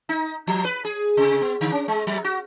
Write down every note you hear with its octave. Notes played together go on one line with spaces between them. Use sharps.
D#4
F3
B4
G#4
C3
B3
D3
C#4
G#3
F#3
F#4